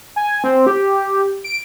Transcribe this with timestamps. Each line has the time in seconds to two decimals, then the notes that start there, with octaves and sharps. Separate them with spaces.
0.16 G#5
0.44 C4
0.67 G4
1.44 D7